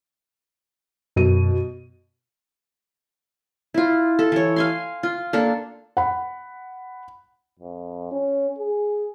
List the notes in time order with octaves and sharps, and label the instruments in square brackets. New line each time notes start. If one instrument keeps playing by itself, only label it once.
[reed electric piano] F#2 [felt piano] B2 D#7
[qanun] E4 F4
A4
E3 C#5
F5 G#5 C6
F4
A#3 D4 A4
[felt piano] F#5 B5
[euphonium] F2
C#4
G#4